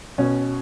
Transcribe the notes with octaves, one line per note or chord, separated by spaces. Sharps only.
B2 C#4